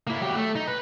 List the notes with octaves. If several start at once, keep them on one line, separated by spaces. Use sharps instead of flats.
A#3 E4
F#3 G4
A3
D#4
B4